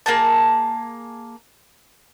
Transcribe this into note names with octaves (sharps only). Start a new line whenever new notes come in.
A#3 G#4 A5